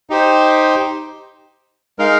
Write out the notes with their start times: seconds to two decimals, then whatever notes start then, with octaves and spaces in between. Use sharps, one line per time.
0.10 D#4 G4 C5
1.99 G#3 D#4 A#4 F5